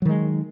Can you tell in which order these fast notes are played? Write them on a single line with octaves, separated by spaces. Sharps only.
F#3 D#3 G#3